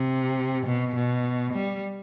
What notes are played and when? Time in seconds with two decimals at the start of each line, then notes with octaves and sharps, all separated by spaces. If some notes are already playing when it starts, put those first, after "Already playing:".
Already playing: C3
0.66 B2
0.95 B2
1.53 G3